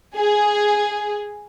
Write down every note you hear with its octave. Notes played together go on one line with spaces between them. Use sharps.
G#4